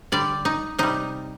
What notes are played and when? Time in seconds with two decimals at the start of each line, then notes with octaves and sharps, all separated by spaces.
0.12 D3 G3 D5
0.45 D#4
0.79 C3 G3 D#4